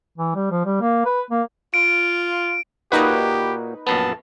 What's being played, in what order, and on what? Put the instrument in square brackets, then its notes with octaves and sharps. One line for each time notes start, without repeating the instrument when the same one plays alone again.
[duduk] E3
G3
F3
G3
A#3
B4
A#3
[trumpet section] F4 [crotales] D7
[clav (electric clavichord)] A#2 A#3 F#4 [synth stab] D#4 B4 [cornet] G4
[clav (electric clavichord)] A#1 F#2 B3 [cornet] A5